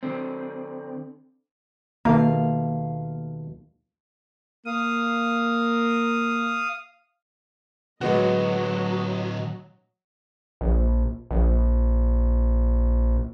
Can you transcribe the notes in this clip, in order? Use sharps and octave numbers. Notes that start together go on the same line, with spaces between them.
D3 C4
D#2 B2 A3 A#3 F5
A#3 F5 D#6
A2 D3 F#3 G#3 B3 F#4 D#5
A#1
A#1